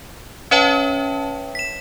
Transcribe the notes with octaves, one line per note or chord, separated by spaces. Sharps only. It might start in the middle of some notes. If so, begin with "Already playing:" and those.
C#4 B4 C#5 E5 G5 A5
B6 E7